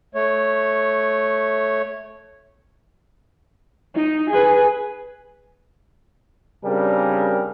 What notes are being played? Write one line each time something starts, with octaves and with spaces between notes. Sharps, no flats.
A3 C#5
D#4
G#4 B4
C#3 G3 C4 D4 G#4 A#4